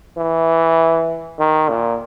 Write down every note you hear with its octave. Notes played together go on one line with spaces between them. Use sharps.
E3
D#3
A#2